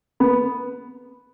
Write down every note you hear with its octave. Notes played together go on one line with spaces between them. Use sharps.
B3